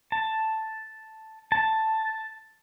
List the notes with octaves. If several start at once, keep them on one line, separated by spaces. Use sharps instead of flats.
A5
A5